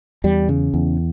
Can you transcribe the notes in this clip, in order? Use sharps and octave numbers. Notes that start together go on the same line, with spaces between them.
E2 G3
C#3
E2